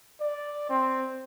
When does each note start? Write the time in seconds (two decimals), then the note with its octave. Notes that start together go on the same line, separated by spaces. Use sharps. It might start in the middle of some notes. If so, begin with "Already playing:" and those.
0.21 D5
0.70 C4